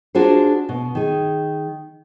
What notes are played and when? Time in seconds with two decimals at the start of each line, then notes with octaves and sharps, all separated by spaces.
0.15 D4 F4 F#4 G#4 A#4 C5
0.69 B2
0.95 D#3 G#4